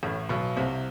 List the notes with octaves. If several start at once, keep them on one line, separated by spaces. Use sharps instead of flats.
A1 A2
B1 B2
C2 C3